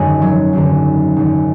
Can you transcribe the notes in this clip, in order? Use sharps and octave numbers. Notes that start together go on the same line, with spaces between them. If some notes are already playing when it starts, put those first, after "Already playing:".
Already playing: G#1 F#2 D3 G#3
F#3
G#1 F#2 D3
G#1 F#2 D3